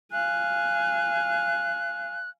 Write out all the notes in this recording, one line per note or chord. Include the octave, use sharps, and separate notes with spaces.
F5 G#5 F#6